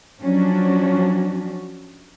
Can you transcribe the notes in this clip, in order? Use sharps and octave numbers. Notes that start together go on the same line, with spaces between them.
F3 F#3 C#4 D4 F#4